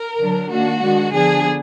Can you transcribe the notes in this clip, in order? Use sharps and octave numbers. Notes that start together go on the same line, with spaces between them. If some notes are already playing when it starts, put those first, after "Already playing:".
Already playing: A#4
D3 F#3 D4
D#3 A#3 D4 F#4
D#3 G#3 D4
D3 F3 B3 D4 G#4